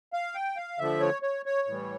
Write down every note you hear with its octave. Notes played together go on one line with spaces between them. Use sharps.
F5
G5
F5
D3 F3 A3 E5
C#5
C#5
C#5
A2 E3 G3